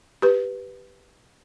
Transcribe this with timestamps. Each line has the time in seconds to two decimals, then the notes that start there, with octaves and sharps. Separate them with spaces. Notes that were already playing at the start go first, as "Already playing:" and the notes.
0.22 G4 B4